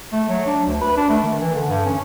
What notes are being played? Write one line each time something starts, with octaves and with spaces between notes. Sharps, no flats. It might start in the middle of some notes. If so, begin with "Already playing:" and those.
A3
F#3
D4
D2
B4
D4
A3
D#3
E3
D3
G2
C#4